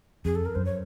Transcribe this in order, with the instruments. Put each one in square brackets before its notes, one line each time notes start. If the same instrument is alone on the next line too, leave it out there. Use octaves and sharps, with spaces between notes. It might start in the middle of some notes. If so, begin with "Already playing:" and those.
[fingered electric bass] F2 [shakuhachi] G#4
[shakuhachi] A4
A#4
[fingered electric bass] F#2 [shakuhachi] C5
[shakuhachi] C#5